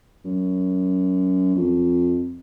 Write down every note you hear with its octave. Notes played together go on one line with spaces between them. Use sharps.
F#2
F2